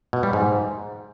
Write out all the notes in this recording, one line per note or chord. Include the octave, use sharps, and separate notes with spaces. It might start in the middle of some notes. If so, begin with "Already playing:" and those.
B2
G3
G#2